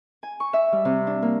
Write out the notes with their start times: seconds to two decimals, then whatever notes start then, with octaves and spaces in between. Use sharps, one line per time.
0.23 G#5
0.40 C#6
0.53 E5
0.72 G3
0.85 C3
1.07 D4
1.22 A#3